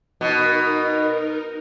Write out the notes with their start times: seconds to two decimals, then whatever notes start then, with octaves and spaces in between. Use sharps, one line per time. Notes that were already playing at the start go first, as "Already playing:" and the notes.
0.21 B2 D#4 A#4